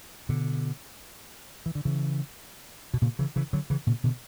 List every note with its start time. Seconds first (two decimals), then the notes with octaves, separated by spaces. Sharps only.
0.29 B2 D3
1.66 E3
1.75 D3
1.85 C#3 E3
2.94 B2
3.02 A#2 C#3
3.19 C#3 E3
3.36 C#3 E3
3.53 D3 F#3
3.70 C#3 E3
3.87 A#2 C#3
4.04 B2 D3